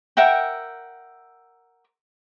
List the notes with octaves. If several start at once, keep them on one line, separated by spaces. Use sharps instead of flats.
A#4 E5 F#5 G5